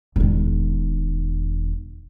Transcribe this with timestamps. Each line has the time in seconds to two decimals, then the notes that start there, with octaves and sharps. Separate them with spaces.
0.16 E1 D#3